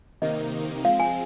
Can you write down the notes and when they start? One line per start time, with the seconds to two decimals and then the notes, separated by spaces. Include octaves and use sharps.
0.22 C3 D#3 A#3 D#4 D#5
0.84 F3 G#3 C4 F5
1.00 G#5